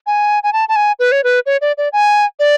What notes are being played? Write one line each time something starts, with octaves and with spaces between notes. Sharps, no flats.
G#5
G#5
A5
A5
G#5
B4
C#5
B4
C#5
D5
D5
G#5
D5